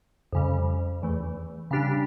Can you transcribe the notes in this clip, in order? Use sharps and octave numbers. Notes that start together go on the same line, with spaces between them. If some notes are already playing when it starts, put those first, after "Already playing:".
F2 C#3 G3
E2 E3 A3
C#3 G3 D4 G4